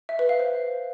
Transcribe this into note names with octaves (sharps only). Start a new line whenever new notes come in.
E5
B4
F5
C5